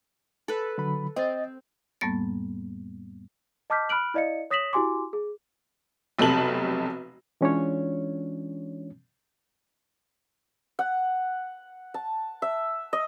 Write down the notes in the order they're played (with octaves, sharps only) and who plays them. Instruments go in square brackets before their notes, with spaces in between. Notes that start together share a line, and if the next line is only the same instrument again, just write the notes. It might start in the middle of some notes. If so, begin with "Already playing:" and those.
[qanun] A4 B4
[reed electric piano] D3 F#3 B5
[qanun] C4 [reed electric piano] D#5 D#6 A6
[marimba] F2 A2 G3 A#3 B3 A6
[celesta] D#5 A5 D6 F6 G6 B6
B5 F6 F#6 D7 F#7
E4 D5 D#5 F5 C#7
C#5 D#6 A#6 B6 E7 F#7
E4 F#4 G4 G#5 C6 D6
G#4
[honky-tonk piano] F1 B1 C3 A4 F#7
[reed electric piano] E3 G#3 C#4 D4 F4 C#5
[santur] F#5
A5
E5
D#5